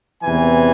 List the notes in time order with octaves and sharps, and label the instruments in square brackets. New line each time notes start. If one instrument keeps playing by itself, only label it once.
[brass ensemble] E2 C3 E3 G#5